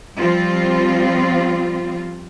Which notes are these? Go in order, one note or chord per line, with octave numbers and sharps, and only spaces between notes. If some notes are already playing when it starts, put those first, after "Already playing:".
F3 G3 C4 F4